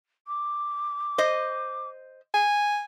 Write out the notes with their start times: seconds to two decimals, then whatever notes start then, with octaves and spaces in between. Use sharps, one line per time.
0.27 D6
1.18 C5 D#5
2.34 G#5